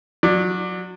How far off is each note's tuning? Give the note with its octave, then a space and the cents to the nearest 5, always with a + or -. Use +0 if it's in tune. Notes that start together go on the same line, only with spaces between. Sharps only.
F#3 -20 D5 +10